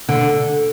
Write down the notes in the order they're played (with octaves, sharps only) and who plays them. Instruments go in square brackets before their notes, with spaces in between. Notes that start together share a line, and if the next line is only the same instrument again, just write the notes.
[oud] D3